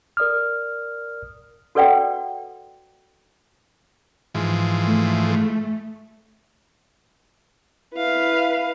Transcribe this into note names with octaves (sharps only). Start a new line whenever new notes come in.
A#4 D5 D#6 F6
F#4 A4 B4 D5 F#5 G5
G#2 E3 F3
A3
E4 B4 F5